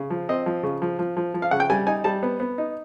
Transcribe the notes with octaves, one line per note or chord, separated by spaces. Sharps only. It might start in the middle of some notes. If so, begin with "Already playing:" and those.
Already playing: C#3
F3
C4 D#5
F3
C#3
F3
F3
F3
F3
F5
C#3 F#5
G5
G3 G#5
D#4 G#5
G3 A5
B3
B3
D#4